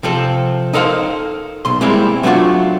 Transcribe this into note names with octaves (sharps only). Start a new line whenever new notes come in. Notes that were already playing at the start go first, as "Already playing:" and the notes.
C3 F3 C4 A4
D#4 A4 A#4 C5 F5
B1 C6
G3 G#3 A#3 C4 E4
F#3 A3 B3 D4 F4 F#4